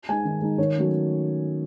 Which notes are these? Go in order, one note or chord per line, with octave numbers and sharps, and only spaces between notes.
G#3 D#4 G#5
D#3
G#3 D#4
D#3 C#5
F#3 A3 C#4